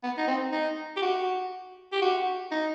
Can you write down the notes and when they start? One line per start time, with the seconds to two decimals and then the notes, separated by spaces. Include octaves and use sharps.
0.03 B3
0.18 D#4
0.28 C4
0.52 D#4
0.96 G4
1.02 F#4
1.93 G4
2.02 F#4
2.51 D#4